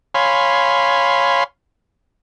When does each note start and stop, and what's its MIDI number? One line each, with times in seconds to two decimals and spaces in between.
0.15 1.44 73
0.15 1.44 77
0.15 1.44 80
0.15 1.44 83
0.15 1.44 84